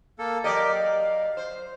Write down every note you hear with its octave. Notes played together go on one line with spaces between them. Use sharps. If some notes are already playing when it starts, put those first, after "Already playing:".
A#3 A4
F#3 G4 A#4 D5 D#5
F5
C5